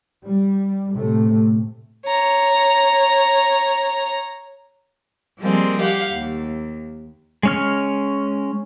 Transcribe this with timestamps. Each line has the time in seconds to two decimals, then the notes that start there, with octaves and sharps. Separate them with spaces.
0.25 G3
0.93 A2 C3 A3
2.06 C#5 A#5
5.40 F3 G3 G#3 A#3 C4
5.80 G4 F5 F#5
6.10 D#2
7.43 G#3 C#4 F6